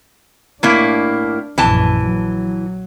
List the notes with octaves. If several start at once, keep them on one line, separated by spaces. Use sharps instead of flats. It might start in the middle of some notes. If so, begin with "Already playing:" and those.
A2 A#3 D4 E4
A#1 F#2 E3 A5
F#3